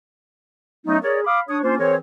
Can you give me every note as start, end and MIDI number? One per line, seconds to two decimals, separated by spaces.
0.86 0.97 54
0.86 0.97 57
0.86 0.97 59
0.86 0.97 61
0.86 0.97 63
1.03 1.20 68
1.03 1.20 70
1.03 1.20 73
1.03 1.20 74
1.25 1.39 77
1.25 1.39 83
1.25 1.39 86
1.25 1.39 87
1.48 1.58 62
1.48 1.58 73
1.48 1.58 87
1.62 1.77 58
1.62 1.77 61
1.62 1.77 62
1.62 1.77 65
1.62 1.77 72
1.78 1.95 52
1.78 1.95 60
1.78 1.95 68
1.78 1.95 70
1.78 1.95 72
1.78 1.95 73